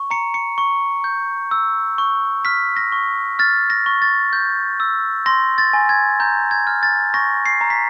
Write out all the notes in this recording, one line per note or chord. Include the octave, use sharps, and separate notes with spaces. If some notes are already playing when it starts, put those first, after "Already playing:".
Already playing: C#6
A#5 C#7
C#7
C#6
G6
E6
C#6
F6 B6
A#6
C#6
F6 A6
A#6
C#6
A6
G6
E6
C6 A#6
A6
G#5
G#6
A#5 G6
G#6
F6
A6
C#6 A#6
C7
A#5
B6